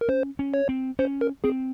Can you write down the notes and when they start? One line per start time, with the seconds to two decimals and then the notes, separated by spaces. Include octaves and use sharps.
0.01 A#4
0.08 C#4 C5
0.39 C#4
0.54 C#5
0.69 C4
0.99 C#4 C5
1.21 A#4
1.44 C4 G#4